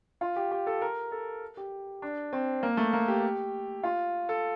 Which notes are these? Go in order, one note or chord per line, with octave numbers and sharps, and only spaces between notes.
F4
G4
G4
A4
A#4
A4
G4
D4
C4
A#3
A3
A#3
G4
F4
A4